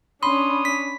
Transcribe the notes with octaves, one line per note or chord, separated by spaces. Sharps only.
C#4 D4 B5 C6 D#6
B6